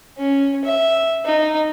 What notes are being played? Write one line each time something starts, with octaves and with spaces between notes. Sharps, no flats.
C#4
E5
D#4